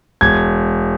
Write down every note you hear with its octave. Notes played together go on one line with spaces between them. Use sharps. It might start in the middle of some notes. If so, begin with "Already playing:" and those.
E1 G#6